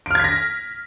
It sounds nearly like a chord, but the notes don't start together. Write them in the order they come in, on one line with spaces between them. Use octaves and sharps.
D7 F6 G#6 B6 A#6